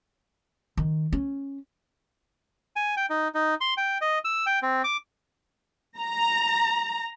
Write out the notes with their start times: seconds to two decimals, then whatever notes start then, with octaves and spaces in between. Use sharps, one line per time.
0.77 D#3
1.13 C#4
2.76 G#5
2.97 G5
3.10 D#4
3.34 D#4
3.61 C6
3.77 G5
4.01 D#5
4.25 E6
4.46 G5
4.62 C4
4.84 D6
5.98 A#5